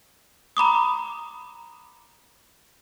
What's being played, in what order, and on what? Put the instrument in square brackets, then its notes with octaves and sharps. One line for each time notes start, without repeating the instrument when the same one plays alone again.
[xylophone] A#5 B5 D6 D#6